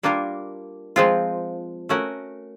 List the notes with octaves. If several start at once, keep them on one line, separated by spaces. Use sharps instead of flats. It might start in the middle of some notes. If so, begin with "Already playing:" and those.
G3 A#3 D4 F4 A#4
F3 G#3 C4 F4
A3 C#4 F#4 A#4